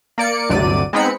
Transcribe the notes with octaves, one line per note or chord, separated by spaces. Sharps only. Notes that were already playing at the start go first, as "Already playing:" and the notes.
A#3 D5 C#7 D7
G1 D2 C3 F#3 D5 D#7
G#3 B3 C4 D#4 B5 C#7